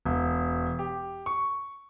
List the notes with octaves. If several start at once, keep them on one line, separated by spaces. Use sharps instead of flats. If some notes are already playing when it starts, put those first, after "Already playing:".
E1
G4
C#6